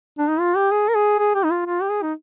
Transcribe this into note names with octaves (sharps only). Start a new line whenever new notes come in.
D4
D#4
F4
G4
G#4
A#4
G#4
G#4
G4
D#4
F4
F4
G4
G#4
D#4